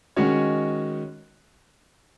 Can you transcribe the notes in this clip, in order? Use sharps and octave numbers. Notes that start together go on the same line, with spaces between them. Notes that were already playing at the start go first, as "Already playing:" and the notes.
D#3 G#3 C#4 F#4 C#5